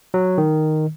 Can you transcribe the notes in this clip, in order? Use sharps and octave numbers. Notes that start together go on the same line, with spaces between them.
F#3
D#3